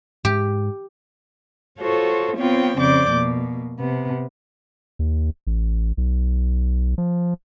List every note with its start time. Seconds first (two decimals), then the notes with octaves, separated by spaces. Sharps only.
0.25 G#2 G4
1.78 F4 F#4 A4 C5 C#5
2.36 B3 C4 F4 C#5 G5
2.78 F2 C#3 C4 D5 D6 G6
3.11 B2 A#3
3.78 C3 B3
4.99 D#2
5.47 A1
5.97 B1
6.98 F3